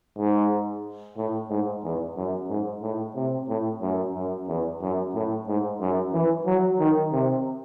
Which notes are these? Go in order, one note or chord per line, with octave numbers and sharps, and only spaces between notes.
G#2
A2
G#2
E2
F#2
G#2
A2
C3
A2
F#2
F#2
E2
F#2
A2
G#2
F#2
E3
F#3
D#3
C3